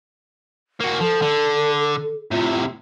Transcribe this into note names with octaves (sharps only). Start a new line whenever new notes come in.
A#3 F#4
F3 A4
D3
A2 C3 F4